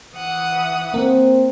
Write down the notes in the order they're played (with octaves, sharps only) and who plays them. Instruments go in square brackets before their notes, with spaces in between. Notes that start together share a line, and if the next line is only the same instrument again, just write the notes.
[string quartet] E3 F#5 D#6
[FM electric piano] A#3 [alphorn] C4